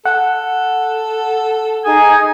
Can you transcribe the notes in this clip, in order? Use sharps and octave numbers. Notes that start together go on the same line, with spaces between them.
A4 F#5
D#4 G#4 G#5 D#6